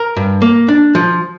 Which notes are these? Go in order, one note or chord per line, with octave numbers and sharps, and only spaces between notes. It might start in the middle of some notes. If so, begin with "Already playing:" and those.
Already playing: A#4
G2
A#3
D4
F3